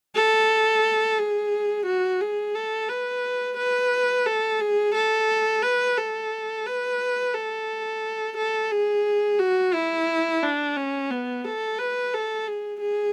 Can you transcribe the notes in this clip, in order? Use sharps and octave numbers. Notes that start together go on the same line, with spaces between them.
A4
G#4
F#4
G#4
A4
B4
B4
A4
G#4
A4
B4
A4
B4
A4
A4
G#4
F#4
E4
D4
C#4
B3
A4
B4
A4
G#4
G#4